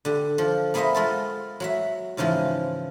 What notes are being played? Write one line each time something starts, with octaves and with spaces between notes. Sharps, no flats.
D3 G4
F3
A#3 B3 G#4 C5 D#5 E5
G#3 F4 A4
F#3 F#4 E5
G#2 C#3 E3 F3 G#3